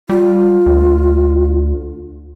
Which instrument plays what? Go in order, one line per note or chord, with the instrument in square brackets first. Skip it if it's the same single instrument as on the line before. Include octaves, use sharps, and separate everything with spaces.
[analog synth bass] G3 [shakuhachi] F4
[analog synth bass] D2